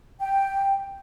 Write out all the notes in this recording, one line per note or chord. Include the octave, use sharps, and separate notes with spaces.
G5